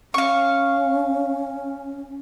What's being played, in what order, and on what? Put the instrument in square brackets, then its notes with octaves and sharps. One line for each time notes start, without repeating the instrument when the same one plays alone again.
[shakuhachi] C#4 [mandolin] F5 C#6